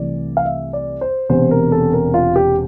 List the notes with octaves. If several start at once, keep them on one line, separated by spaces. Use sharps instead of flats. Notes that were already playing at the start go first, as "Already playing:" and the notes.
Already playing: C2 C3 E3 A3 D5
F5
E5
D5
C5
E1 E2 C3 C5
A#4
A4
A#4
F4
G4